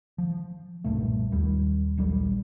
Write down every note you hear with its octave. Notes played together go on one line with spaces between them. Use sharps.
F3
B1 G2 A#2 A3
D#2 G3
D#1 A#1 F#3 G3